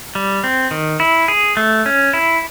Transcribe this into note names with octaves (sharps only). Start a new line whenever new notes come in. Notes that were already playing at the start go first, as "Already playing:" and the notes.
G3
C4
D#3
E4
G#4
A3
C#4
E4